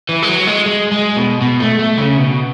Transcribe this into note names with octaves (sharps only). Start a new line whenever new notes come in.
E3
G#3
F#3
G#3
G#3
G#3
B2
B2
A3
A3
C#3
B2